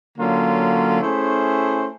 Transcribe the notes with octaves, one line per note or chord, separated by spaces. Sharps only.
D3 F#3 A#3 C#4 F4
A3 C#4 E4 G#4 C5